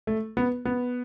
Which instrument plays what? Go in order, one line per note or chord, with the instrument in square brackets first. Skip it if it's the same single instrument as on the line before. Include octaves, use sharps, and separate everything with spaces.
[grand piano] A3
B3
B3